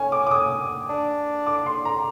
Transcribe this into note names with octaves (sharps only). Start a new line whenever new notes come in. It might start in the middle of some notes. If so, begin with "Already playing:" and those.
Already playing: C#4 G#5
D6
D6
D#6
D4
D6
C6
A#5